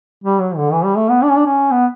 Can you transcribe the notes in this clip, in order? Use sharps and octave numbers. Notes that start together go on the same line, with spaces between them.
G3
F#3
D3
E3
G3
A3
B3
D4
C#4
D4
C#4
B3